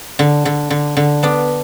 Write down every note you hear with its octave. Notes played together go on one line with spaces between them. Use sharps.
D3
D3
D3
D3
B3 D4